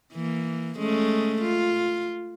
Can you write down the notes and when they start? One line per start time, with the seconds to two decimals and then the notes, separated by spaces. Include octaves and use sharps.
0.13 E3 A#3
0.79 G#3 A3 C#4
1.42 F4